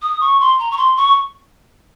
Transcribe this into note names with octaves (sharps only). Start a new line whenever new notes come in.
D#6
C#6
C6
A#5
C#6
C6
C#6